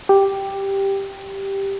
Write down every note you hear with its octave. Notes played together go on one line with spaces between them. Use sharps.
G4